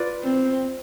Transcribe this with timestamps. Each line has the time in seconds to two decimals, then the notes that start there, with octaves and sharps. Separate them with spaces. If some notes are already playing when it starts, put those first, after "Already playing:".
Already playing: F4 B4 D5
0.24 C4